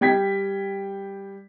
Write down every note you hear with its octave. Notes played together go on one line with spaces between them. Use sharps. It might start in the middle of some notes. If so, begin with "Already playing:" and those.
G3 G5 G#6 B6